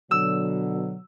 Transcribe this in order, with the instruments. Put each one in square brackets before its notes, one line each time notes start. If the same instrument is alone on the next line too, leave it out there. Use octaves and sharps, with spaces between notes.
[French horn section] B2 D3 F#3 [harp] E6